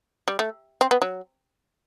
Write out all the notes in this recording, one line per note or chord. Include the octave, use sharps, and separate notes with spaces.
G3
A3
C4
B3
F#3